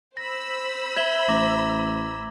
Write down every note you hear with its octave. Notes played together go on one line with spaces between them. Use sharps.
C5 B5 E6 A#6
E5 G#6 F#7 G7
A1 A#5 D6 A#6